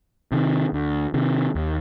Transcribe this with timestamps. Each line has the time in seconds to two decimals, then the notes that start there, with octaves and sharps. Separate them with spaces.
0.32 C3 D#3
0.73 D2
1.14 C3 D#3
1.55 D#2